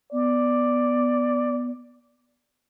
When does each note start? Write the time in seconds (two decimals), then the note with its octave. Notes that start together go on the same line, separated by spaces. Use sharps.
0.12 B3 D5